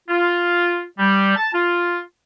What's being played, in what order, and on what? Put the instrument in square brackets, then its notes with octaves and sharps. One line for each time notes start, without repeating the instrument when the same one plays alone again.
[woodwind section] F4
G3
A5
F4